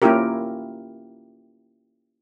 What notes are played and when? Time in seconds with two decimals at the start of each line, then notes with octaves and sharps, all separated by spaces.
0.02 A#3 C#4 E4 F4 G4 A#4